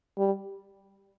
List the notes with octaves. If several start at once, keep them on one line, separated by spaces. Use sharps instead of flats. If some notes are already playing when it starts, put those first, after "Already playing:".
G3